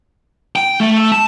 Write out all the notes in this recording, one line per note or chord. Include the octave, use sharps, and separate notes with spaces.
G5
A3
A5